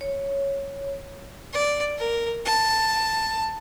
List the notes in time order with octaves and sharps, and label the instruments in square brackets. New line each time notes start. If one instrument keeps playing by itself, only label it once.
[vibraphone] C#5
[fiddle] D5
A#4
A5